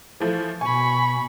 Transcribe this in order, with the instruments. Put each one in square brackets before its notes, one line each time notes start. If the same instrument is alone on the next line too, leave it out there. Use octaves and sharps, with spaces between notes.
[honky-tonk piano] E3 F3 A3
[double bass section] B2 [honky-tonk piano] G#5 [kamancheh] B5 C#6